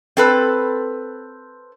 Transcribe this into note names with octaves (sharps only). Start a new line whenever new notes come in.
C4 A4 B4